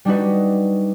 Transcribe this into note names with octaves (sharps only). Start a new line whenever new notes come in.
G3 D4 D#4 F#4 B4